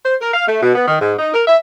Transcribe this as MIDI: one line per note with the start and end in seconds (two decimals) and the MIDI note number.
0.06 0.15 72
0.20 0.32 70
0.33 0.47 77
0.47 0.60 57
0.62 0.74 47
0.75 0.87 59
0.87 0.99 51
1.01 1.13 44
1.19 1.33 63
1.34 1.42 70
1.48 1.57 76